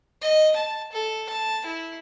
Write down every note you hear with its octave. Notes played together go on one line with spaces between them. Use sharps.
D#5
A5
A4
A5
E4